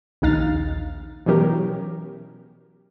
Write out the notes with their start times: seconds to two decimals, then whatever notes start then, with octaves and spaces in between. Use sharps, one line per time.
0.22 A#1 D#2 D#4 F5 F6 A6
1.26 B2 E3 F#3 C#4 G4 A#4